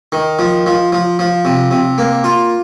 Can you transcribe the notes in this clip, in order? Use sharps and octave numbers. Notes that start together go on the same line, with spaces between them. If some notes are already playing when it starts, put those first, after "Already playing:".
D#3
F3
F3
F3
F3
C3
C3
A#3
F4